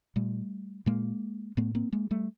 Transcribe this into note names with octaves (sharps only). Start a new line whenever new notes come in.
A#2 G3 A3
A#2 G#3 A#3
A2 A3 B3
A#3 C4
G#3 A#3
G3 A3